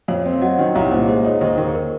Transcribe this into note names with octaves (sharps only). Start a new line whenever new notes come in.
F2 C#5 F5
C4
F#3 D#5 F#5
D#3
C2 C#5 F5
A#2 C5 D#5
G#3 C5
D#4 C#5
D#2 C5
D#2 A#4
G#4
A#4